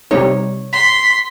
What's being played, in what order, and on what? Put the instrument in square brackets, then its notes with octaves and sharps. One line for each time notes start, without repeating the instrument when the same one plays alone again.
[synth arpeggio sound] C3 G3 D#4 [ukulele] C#5
[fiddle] C6 [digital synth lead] B6